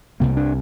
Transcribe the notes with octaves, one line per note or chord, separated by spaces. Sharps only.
C2 C3 A#3
D4